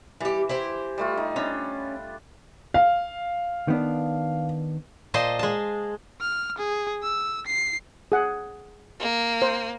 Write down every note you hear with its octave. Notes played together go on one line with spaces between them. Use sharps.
E3 G3 G4
E4 G4 C5
G3 A3 F4
D#4
C#4 D4 C5
F5
D#3 B3 D4
A#2 C5 D#5 A5
G#3 A5
F6
G#4
E6
C7
G#4 F#5
A#3
C5